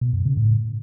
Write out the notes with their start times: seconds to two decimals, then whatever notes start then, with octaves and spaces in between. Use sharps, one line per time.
0.01 B2
0.13 F#2
0.25 C#3
0.37 A2